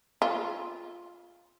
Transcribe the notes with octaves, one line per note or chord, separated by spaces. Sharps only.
F4